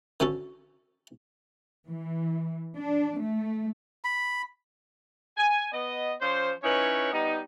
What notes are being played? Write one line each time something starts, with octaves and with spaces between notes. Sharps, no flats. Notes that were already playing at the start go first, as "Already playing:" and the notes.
D3 C#4 F#4 A4
E3
D4
A3
B5
G#5
B3 D#5
F3 C#4 C5
C#4 D#4 E4 B4 C#5
G3 B3 D#4